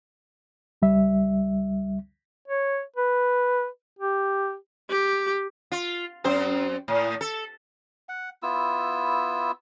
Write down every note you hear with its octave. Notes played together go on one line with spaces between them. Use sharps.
C#2 G3 E5
C#5
B4
G4
G4
F4
F#2 C4 C5
A2
A4
F#5
B3 E4 F4 E6